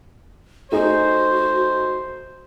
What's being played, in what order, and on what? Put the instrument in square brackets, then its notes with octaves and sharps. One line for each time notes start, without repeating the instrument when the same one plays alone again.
[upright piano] A3 D#4 G#4 [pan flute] F#4 [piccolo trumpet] C5